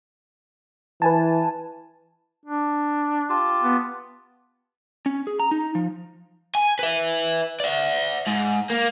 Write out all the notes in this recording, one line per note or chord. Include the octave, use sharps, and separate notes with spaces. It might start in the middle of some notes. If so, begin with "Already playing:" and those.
E3 B4 G#5 A5
D4
F4 G4 A5
B3
C#4
G#4
A#5
D#4
F3
G#5
B4 E5
D5 E5
G#2
A#3